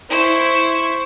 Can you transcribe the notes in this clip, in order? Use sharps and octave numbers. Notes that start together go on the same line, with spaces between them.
E4 C5 C#6